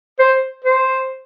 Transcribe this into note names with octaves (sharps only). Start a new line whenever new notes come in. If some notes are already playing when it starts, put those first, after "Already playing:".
C5
C5